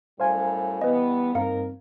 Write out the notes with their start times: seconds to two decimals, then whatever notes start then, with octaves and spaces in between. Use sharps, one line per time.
0.20 F#2 A2 G3 C5 F5 G#5
0.81 E3 G3 B3 B4 D#5
1.35 G2 D#3 A#3 C4 A#4 F5 C#7